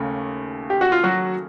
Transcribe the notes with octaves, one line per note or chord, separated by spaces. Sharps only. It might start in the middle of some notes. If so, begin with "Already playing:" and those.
Already playing: D#2 C#3 A3
G4
F#4
F4
F#3 F#4